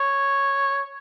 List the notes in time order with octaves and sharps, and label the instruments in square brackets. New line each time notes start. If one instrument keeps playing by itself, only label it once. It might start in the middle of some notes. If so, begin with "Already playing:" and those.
Already playing: [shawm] C#5